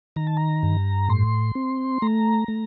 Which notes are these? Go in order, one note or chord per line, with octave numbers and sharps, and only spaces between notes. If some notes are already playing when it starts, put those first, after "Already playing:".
D#3 A#5
A5
A#5
G2
A2 C6
C4
A3 A#5
A3